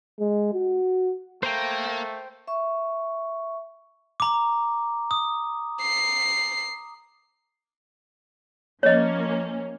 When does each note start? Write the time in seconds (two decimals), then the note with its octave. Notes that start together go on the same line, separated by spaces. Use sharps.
0.20 G#3
0.53 F#4
1.43 A3 A#3 C5 G5
2.47 E5 C#6
4.20 A#5 D6
5.11 D#6
5.82 C7
8.83 F3 A#3 C#4 C#5 D#5